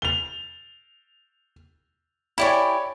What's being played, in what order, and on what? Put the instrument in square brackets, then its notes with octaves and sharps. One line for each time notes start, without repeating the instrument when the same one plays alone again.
[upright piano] F7 G7
[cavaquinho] E4 G4 G#5 [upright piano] C#5 D5 B5